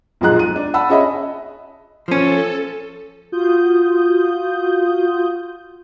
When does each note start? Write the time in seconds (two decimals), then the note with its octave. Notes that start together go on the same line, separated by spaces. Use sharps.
0.21 B1 A#2 F3 G#3 A#5 F#6
0.39 D#7
0.56 D4
0.74 F#5 A5 B5 E6
0.89 C#4 G#4 D#5 E5 B5
2.08 F3 C#4 A4
3.32 F4 F#4 D#6 G6